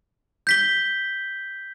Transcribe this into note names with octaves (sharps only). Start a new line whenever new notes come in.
G6 B6 G7